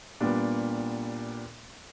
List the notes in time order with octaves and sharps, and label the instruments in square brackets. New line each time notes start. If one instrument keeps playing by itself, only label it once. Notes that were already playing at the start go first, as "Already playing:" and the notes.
[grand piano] A#2 G3 B3 D4